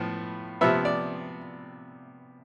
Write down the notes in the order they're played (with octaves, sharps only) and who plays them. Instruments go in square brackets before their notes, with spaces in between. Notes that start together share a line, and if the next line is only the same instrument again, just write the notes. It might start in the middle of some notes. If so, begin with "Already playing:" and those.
Already playing: [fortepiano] A2 F3 B3
C3 F3 B3 E5
D5